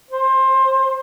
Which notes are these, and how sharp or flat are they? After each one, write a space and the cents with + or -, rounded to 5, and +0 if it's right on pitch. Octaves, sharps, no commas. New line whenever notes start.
C5 +20